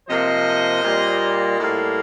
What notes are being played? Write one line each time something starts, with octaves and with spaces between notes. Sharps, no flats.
C3 F3 A#3 C5 D#5
A#2 G3 A#3
A2 G3 A#3